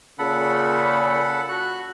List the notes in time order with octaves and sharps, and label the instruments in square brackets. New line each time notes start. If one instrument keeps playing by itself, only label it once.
[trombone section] A#2 C#3 [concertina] A4 F#5 B5
[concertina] F#4 F#6